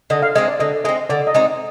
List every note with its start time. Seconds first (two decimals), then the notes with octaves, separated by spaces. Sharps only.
0.10 D3 D#5
0.22 F5
0.35 G#3 C4 D#5
0.48 D5
0.60 D3 D#5
0.84 G#3 C4 D#5
1.09 D3 D5
1.27 D#5
1.34 G#3 C4 D#4